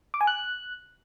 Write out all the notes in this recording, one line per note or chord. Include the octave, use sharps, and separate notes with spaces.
D6
G#5
F#6